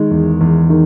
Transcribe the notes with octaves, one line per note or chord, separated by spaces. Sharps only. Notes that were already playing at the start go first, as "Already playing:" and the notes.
Already playing: D#3 G#3
E2
E2
D#3